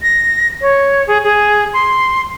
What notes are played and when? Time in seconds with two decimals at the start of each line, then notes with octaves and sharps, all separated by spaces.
0.02 A#6
0.61 C#5
1.07 G#4
1.24 G#4
1.73 C6